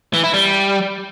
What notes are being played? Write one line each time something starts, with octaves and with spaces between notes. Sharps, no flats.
E3
E4
G3